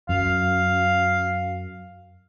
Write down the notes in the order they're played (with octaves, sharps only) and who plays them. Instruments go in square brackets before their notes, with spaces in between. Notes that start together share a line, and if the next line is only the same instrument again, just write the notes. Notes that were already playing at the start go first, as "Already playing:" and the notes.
[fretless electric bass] F#2 [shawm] F5